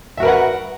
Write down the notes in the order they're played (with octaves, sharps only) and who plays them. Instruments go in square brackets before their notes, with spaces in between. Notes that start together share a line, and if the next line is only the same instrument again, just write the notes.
[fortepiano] E5
F#4
A#4
B4
F#5